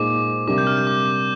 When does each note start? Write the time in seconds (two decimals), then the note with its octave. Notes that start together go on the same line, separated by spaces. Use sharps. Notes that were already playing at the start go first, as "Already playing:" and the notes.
Already playing: A#2 G#3 D#4 G#4 C5 D6
0.47 C3 G3 D4 G4 A#4 D6
0.58 G6
0.67 F6
0.77 G6
0.87 D6